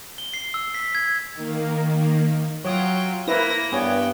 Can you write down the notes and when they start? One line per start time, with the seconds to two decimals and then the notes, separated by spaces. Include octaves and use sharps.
0.18 G7
0.34 C7
0.54 E6
0.75 B6
0.95 G#6
1.35 D#3 A#3
2.65 F#3 F4 C#5 G5 D#6
3.28 A#3 E4 B4 C5 E6 A#6
3.72 G2 B3 C#5 G5 G#5